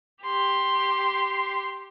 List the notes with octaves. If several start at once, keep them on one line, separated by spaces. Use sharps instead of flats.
G4 C6